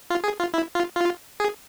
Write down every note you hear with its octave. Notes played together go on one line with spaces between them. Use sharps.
F4
G#4
F4
E4
F4
F4
G#4